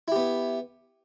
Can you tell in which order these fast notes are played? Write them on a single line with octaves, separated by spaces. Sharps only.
E4 G4 B3